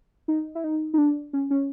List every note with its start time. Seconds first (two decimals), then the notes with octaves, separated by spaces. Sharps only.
0.28 D#4
0.55 E4
0.64 D#4
0.94 D#4
0.98 D4
1.33 C#4
1.50 C#4